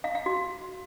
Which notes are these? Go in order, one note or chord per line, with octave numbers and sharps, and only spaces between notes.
F5
F5
F#4